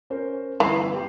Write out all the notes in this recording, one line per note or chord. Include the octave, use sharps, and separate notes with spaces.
C#4 A#4 C5
G1 E3 C7
G4 G5